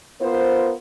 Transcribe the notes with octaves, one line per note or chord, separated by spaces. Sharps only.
B3 F4 A#4 C5